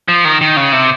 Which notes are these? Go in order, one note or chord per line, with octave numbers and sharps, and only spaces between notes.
F3
D#3
D#3
C#3
C3